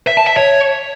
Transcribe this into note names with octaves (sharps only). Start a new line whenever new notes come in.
E5
A5
E5
C#5